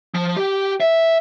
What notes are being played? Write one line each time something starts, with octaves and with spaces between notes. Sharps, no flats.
F3
G4
E5